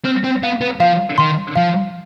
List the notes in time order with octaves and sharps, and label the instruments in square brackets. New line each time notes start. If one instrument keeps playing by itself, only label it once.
[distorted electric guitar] C4 [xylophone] F6
[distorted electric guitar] C4
[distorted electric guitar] B3 [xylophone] F5
[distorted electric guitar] B3
[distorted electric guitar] F3 [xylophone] F5
[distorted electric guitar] D#3 [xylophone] C6
[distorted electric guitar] F3 [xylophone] F5